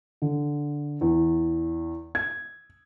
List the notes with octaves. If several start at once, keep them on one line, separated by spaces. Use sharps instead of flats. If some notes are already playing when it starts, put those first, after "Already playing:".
D3
E2
G#6